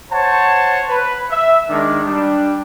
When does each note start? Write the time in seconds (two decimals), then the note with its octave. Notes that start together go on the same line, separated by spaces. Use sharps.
0.12 C5 C#5 F#5 A5
0.88 B4
1.31 E5
1.69 D#3 G#3 D4
2.04 G3 D4